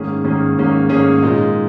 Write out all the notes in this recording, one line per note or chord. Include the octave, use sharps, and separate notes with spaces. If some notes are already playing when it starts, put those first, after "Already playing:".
Already playing: G#2 D#3 A#3 C#4 G#4
G#2 D#3 A#3 C#4 G#4
G#2 D#3 A#3 C#4 G#4
G#2 D#3 A#3 C#4 G#4
A#2 G#3 D#4